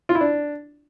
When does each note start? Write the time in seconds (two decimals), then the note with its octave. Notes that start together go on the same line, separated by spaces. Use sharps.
0.09 F4
0.15 E4
0.21 D4